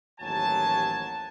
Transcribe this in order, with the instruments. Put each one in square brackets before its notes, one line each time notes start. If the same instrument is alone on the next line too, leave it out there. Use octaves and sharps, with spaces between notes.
[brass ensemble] A1 D#2 F3 F#3 G#5 A5